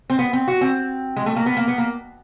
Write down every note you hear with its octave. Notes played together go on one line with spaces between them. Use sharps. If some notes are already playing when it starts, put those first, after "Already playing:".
C4
B3
C4
F#4
C4
G#3
A3
A#3
B3
A#3
B3
A#3